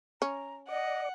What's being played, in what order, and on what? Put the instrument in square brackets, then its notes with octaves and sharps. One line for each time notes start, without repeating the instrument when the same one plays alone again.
[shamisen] C#4 [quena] A#5
[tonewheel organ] D5 [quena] D#5 [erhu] F#5